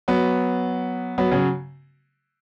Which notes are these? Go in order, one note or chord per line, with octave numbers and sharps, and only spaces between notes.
F#3 B3
F#3 B3
C#3 F#3